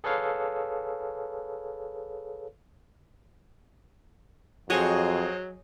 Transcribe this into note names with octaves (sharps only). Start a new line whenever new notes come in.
G#4 A4 B4 C#5 F5
F2 F#3 F#4 G#4 C5 C#5 D#5 G#5